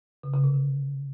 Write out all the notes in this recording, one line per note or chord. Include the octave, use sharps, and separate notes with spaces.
C#3
C#3
C3
D3